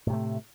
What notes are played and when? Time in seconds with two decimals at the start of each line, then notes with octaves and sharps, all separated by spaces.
0.06 A2
0.10 C3
0.13 A3